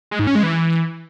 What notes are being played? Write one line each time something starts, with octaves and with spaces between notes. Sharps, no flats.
G#3
G#2
C#4
G#3
E3